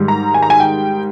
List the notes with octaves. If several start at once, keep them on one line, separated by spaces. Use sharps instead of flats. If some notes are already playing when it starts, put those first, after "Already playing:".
Already playing: G#2 D#3 G3
A#5
G#5
A#5
G#5
G5